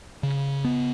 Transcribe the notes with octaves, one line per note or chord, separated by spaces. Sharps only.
C#3
B3